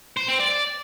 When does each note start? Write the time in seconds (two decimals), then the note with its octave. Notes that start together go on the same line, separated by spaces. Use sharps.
0.17 C5
0.28 C4
0.40 D5